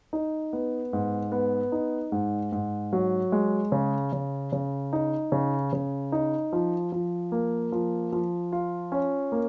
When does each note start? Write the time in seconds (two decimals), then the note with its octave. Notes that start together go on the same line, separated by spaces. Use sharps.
0.13 D#4
0.53 B3
0.93 G#2
1.32 B3
1.72 D#4
2.12 G#2
2.52 G#2
2.93 F#3
3.32 G#3
3.72 C#3
4.13 C#3
4.52 C#3
4.93 D#4
5.32 C#3
5.73 C#3
6.12 D#4
6.53 F3
6.92 F3
7.32 A#3
7.72 F3
8.12 F3
8.52 F4
8.92 C#4
9.32 A#3